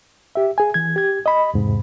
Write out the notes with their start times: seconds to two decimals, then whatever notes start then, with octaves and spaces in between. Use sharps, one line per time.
0.35 G4 E5
0.58 G#4 G#5
0.74 E3 G#6
0.96 G4 G#6
1.26 D#5 B5
1.54 E2 G#2 C3